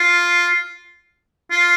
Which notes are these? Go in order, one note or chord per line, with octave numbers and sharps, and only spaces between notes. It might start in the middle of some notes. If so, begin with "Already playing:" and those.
Already playing: F4
F4